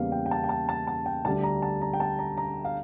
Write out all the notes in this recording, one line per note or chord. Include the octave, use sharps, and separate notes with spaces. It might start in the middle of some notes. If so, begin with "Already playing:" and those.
Already playing: E2 C#3 G3 A#3 F5
G5
G5
A5
G5
A5
A5
A5
G5
D2 D3 G3 A5
A#5
A5
A#5
G5
A5
A#5
A#5
F5